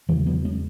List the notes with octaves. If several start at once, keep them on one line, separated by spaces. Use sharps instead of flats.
E2 C#3 E3 G#3
F#3 B3
G#3 C#4